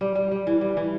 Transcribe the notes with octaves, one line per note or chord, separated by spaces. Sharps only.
G3
G3
G3
E3
G3
E3